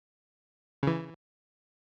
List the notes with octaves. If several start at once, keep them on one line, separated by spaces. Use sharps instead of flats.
C#3 E3